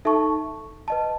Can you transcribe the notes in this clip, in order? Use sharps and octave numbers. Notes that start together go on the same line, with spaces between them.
D#4 A4 E5 A5 C#6
B4 D#5 A5